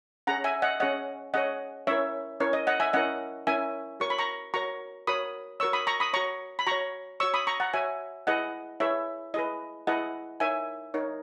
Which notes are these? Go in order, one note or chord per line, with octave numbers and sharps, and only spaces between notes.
C#4 G#4 C#5 F#5 A#5
E5 G#5
D#5 F#5
C#4 G#4 C#5 D#5 F#5
C#4 G#4 C#5 D#5 F#5
C#4 E4 A#4 C#5 E5
C#4 E4 A#4 C#5
D#5
D#5 F#5
E5 G#5
C#4 E4 A#4 D#5 F#5
C#4 E4 A#4 E5 G#5
F#4 A#4 C#5 C#6
B5
A#5 C#6
F#4 A#4 C#5 A#5 C#6
F#4 A#4 C#5 B5 D#6
F#4 A#4 C#5 C#6 E6
B5 D#6
A#5 C#6
B5 D#6
F#4 C#5 A#5 C#6
B5
F#4 C#5 A#5 C#6
F#4 C#5 C#6 E6
B5 D#6
A#5 C#6
F#5 A#5
F#4 C#5 E5 G#5
E4 G#4 B4 D#5 F#5
E4 G#4 B4 C#5 E5
E4 G#4 B4 D#5
E4 G#4 B4 D#5 F#5
D#4 A#4 C#5 E5 G#5
D#4 A#4 C#5